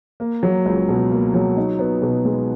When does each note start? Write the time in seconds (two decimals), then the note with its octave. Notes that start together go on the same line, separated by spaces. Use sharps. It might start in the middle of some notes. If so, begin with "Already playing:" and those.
0.20 A#3
0.43 F#3
0.66 C#2
0.89 B2
1.11 A#3
1.34 F#3
1.57 D#4
1.79 B3
2.02 B2
2.25 G#3